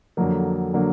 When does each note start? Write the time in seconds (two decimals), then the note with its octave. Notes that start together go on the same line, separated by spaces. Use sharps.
0.17 F2 D3 F#3 A#3
0.74 D3 F#3 A#3